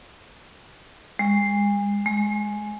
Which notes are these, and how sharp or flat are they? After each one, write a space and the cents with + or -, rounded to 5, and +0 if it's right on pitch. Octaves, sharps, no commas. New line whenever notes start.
G#3 -35
G#3 +5